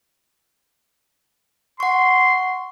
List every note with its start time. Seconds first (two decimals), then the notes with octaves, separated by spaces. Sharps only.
1.80 F#5 C6 C#6